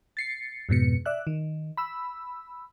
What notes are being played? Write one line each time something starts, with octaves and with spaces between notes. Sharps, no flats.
A6 C7 C#7
F2 G#2 B2 C#7
D5 E5 F#6
D#3
B5 E6